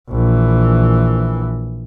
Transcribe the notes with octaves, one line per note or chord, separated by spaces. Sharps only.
A#1 E3